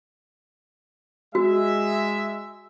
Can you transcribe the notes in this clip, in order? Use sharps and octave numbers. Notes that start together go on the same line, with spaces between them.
G#3 F#4 E5